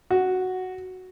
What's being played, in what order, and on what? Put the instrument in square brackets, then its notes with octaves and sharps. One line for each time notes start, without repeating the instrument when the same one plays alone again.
[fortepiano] F#4